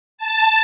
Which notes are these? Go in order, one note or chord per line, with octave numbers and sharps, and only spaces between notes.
A5